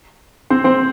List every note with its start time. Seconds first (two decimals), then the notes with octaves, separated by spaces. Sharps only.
0.50 C4 C5
0.64 C4 C5